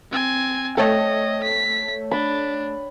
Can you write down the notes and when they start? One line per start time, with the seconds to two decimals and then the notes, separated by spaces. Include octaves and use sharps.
0.11 C4 G#5
0.77 A3 A4 C#5 D#5 G5
1.43 B6
2.11 D4 B5